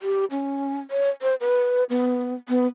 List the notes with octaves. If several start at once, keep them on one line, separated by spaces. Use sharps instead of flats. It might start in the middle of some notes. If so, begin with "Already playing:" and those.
G4
C#4
C#5
C5
B4
B3
B3